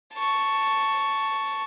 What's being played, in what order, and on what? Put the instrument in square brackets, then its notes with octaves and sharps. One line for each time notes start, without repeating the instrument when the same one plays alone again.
[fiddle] A5 C#6